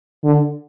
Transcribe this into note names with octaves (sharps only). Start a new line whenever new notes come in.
D3